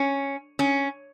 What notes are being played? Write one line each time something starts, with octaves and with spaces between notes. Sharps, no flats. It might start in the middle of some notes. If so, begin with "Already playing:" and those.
Already playing: C#4
C#4